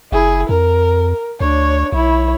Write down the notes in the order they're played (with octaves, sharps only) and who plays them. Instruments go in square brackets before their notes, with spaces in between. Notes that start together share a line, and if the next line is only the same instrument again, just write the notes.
[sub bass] F#1 [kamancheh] E4 G#4
[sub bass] F2 [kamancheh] A#4
[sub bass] D2 [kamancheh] D4 C#5
[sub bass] B1 [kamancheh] E4 C#5